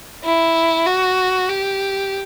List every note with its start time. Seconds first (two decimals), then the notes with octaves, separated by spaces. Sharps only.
0.24 E4
0.87 F#4
1.50 G4